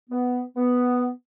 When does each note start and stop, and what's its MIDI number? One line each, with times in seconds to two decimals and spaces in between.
0.10 0.41 59
0.57 1.08 59